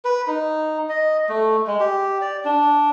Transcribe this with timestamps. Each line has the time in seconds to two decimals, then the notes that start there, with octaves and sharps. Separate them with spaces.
0.05 B4
0.27 D#4
0.89 D#5
1.29 A3
1.67 G#3
1.80 G4
2.21 D5
2.45 D4